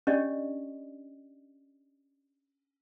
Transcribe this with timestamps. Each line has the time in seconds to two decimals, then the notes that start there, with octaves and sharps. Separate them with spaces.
0.07 C#4 D4 G4 D5 D#5